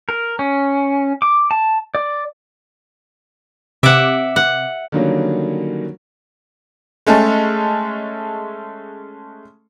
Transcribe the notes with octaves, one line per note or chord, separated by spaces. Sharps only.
A#4
C#4
D6
A5
D5
C3 E5 F#5 D6
F#5
D3 D#3 F#3 G3 A#3 C#4
G#3 A3 C#4 A4